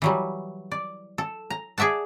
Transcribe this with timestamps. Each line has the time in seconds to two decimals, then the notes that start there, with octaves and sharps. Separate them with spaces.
0.02 E3 F#3 G3
0.72 D5
1.18 A4
1.50 A#5
1.78 G#4 D5 E5 F#5 A5